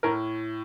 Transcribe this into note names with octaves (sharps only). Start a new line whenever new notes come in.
A2 A#4